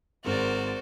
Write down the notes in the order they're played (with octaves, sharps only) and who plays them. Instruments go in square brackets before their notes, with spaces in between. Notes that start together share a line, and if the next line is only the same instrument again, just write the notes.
[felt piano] G#1 G#3 [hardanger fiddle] F#4 C5 [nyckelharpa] A#4 D5